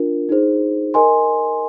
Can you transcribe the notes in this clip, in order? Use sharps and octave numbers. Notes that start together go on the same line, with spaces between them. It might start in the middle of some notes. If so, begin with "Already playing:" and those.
Already playing: D4 F4 A#4
D#4 G#4 C5
A#4 D#5 G#5 C6